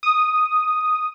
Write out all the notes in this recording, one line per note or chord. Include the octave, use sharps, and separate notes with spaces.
D#6